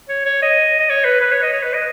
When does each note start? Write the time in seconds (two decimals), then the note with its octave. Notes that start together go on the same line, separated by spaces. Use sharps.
0.09 C#5
0.26 C#5
0.42 D#5
0.80 D#5
0.89 C#5
1.04 B4
1.20 B4
1.32 C#5
1.42 D#5
1.53 C#5
1.62 B4
1.73 D#5